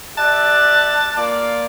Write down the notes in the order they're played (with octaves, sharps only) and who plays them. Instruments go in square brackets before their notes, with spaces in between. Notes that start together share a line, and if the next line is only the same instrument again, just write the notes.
[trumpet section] G4 D5 E5 [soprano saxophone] A5 [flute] F#6
[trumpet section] A#3 F4 D5